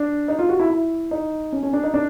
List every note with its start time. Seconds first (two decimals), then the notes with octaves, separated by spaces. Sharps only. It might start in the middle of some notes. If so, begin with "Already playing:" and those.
Already playing: D4
0.28 D#4
0.39 F4
0.49 F#4
0.60 E4
0.70 E4
1.11 D#4
1.52 C#4
1.63 C#4
1.73 D4
1.83 D#4
1.94 D4